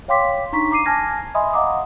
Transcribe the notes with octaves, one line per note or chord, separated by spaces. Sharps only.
C#5 F5 G5 C6 D6 B6
D4 D#4 A#5 C#6 B6
A#5 D6 C7 D#7
G#5 A5 F6 G#6 A#6
D#5 E5 G#5 B5 C6 D#6
D#5 F5 F#5 A#5 D6 D#6